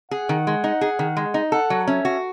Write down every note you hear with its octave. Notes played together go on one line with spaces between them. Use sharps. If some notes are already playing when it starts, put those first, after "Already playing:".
G#4 F#5
D#3
G#3
D#4
G#4
D#3
G#3
D#4
A4 F#5
F#3
C#4 E5
F#4